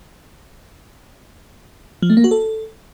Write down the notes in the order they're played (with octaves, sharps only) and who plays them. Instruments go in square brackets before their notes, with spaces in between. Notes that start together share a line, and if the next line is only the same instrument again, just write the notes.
[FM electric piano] F3
A3
A#3
F#4
A4